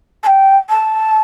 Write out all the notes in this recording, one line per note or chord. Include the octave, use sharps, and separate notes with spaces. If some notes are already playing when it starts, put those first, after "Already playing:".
A5
G5
A5